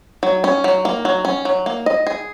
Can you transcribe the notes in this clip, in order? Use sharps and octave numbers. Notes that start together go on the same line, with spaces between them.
F#3
C#4
F#3
A#3
F#3
C#4
F#3
A#3
D#5
G#4